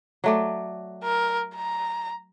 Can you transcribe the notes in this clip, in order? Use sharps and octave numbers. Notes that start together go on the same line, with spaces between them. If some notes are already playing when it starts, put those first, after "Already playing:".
F#3 A3 D5
A#4
A#5